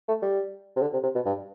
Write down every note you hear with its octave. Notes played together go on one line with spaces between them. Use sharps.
A3
G3
C3
D3
C3
C3
B2
G2